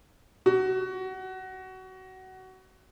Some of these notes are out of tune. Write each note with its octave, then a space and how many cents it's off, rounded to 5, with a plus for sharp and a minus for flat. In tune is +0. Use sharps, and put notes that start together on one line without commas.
F#4 +20